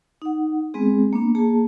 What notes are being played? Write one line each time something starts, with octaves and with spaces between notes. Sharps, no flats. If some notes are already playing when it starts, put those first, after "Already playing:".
D#4 F#5
G#3 B3 C4 G#4
A#3 B3 D4
A#3 G#4 A5